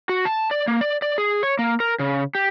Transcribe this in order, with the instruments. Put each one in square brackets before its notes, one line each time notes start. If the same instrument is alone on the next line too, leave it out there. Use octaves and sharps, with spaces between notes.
[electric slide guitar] F#4
A5
D5
A#3
D5
D5
G#4
C#5
A#3
A#4
C#3
G4